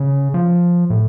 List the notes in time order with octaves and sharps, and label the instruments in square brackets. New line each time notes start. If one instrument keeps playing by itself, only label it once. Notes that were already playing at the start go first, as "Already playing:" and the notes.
Already playing: [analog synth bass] C#3
F3
A2